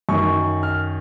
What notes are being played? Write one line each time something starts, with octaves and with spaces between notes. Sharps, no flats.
F#2 D#3 C#6
F6